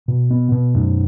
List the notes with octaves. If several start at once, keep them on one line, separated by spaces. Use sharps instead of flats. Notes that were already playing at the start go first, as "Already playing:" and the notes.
B2
B3
B2
F#2